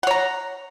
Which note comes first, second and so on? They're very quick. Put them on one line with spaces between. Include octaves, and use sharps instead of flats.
F#5 C#5 A#5